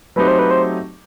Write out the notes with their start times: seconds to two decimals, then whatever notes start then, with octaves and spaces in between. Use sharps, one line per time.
0.16 F#3 A3 C4 D#4 G4 B4
0.28 C5
0.39 B4
0.51 C5